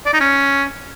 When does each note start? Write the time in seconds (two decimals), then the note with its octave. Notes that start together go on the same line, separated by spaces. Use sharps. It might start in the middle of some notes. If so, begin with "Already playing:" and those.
0.06 D5
0.13 D#4
0.21 C#4